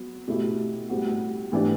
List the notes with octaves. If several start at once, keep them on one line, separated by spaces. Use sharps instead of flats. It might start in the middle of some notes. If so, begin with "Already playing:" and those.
Already playing: F#3 B3
B2 A3 E4 G4
A2 G3 B3 F#4
A2 E3 B3 D4 G4